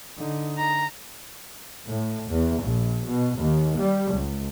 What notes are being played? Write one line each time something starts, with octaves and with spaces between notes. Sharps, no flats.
D3 D#4
A#5
A2
E2
A#1
B2
D#2
G3
C#2